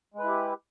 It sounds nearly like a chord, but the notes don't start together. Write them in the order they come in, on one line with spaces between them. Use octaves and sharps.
G#3 B4 E4 G4